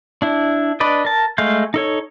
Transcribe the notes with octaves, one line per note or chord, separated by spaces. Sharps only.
D4 E4
D4 B4 D5 D#5
A#4 A5
G#3 A3 F5 G6
D#4 A4 C#5